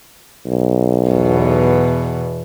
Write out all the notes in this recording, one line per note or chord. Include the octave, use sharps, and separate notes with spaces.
B1
E2 B2